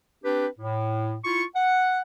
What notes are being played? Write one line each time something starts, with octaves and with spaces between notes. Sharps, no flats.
C4 D4 G4 B4
A2
E4 F4 C#6
F#5